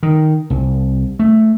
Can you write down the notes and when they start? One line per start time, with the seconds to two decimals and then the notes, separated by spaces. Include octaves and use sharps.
0.03 D#3
0.50 C2
1.19 A3